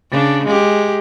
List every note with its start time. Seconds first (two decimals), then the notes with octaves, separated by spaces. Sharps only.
0.11 C#3 D4
0.46 G#3 G4